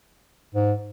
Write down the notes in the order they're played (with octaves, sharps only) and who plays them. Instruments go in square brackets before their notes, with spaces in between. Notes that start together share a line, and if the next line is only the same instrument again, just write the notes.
[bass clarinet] G#2